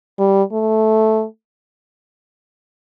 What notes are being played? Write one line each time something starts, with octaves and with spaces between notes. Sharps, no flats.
G3
A3